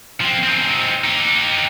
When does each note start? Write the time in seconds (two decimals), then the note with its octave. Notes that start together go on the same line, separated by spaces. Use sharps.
0.21 F3 C4
0.44 C4 D#4
1.04 D#4 G4